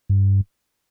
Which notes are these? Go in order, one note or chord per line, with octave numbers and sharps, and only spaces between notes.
G2